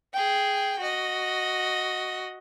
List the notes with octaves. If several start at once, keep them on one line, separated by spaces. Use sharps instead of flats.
G#4 G5
F#4 D#5